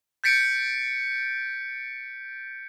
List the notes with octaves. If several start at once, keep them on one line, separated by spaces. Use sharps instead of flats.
G6 A6 B6 C#7 D7